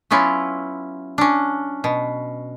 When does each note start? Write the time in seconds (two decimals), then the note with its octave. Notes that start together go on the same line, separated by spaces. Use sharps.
0.11 F#3 B3 C#4 E4 F4
1.18 C#4 D4
1.84 B2